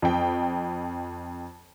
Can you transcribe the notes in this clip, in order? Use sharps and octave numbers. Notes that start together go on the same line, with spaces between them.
F2 G5